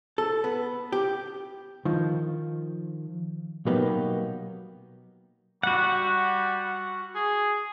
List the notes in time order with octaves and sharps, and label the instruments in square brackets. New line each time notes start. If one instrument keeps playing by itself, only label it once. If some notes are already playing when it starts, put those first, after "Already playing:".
[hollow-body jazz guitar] A4
B3
G4
D#3 F3
B2 F#3 A#3 B3 D#4 G4
[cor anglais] G3 [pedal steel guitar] F#4 F#5
[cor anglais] G#4